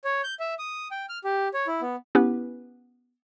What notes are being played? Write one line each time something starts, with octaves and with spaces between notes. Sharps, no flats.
C#5
G6
E5
D#6
G5
F6
G4
C#5
E4
B3
B3 C#4 E4 G4 B4